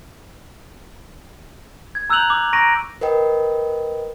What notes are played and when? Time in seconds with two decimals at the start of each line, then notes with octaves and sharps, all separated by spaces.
1.95 G#6
2.10 A#5 E6 F#6 G6 F7 F#7
2.30 D6
2.53 A#5 C#6 A#6 D7 D#7
3.01 A#4 B4 D#5 G5